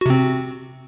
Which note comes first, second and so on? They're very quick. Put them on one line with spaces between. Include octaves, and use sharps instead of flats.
F#4 C3 C4